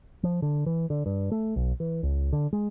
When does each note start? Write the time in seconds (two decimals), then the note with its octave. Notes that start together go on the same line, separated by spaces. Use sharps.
0.23 F3
0.42 D3
0.66 E3
0.90 D3
1.06 G2
1.32 A3
1.56 B1
1.80 E3
2.03 C#2
2.33 D3
2.53 G#3